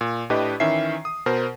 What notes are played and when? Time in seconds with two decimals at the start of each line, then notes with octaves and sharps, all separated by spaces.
0.01 A#2
0.30 A2 D4 G4 B4 D#5
0.60 D#3 E3 C#4 E5 C7
1.05 D#6
1.26 B2 A#4 C5